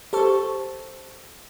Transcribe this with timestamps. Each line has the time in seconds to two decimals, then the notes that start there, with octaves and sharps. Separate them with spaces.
0.13 G4 A4 C5 A5 C#6 E6